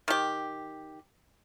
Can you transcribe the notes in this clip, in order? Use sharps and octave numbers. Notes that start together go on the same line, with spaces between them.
D#3 G4